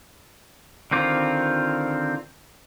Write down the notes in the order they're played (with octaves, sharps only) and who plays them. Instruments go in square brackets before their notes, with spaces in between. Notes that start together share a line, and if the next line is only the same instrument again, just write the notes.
[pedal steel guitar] D3 D#3 C4 F4 D6